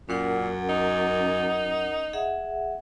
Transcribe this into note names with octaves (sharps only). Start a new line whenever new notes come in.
F#2 A#2 C#4 A#4 F#5
D#4
G#4 E5 F#5